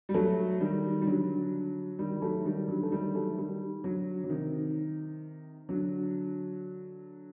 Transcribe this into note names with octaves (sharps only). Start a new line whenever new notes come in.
G3
F#3 A3
D#3 G3
G3
D3 F#3
D#3 G3
G3
F#3 A3
D#3 G3
D3 F#3
A3
D#3 G3
F#3 A3
D#3 G3
D3 F#3
F#3
C3 D#3
D3 F#3